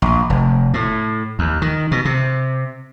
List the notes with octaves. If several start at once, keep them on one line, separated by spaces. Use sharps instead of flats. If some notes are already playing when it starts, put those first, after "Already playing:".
A#1
F1
A2
D#2
D#3
B2
C3